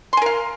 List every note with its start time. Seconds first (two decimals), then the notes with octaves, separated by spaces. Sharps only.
0.13 C6
0.17 G#5
0.22 A#4
0.26 F5